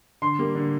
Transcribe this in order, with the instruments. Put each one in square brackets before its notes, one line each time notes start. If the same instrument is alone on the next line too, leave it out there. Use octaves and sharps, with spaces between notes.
[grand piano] D3 C6
G3 A#3
D3